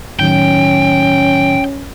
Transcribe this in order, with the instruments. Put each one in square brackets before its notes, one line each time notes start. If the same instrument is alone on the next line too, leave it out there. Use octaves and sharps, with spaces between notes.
[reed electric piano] A2 D#3 F#3 [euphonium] C#4 [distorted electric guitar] G5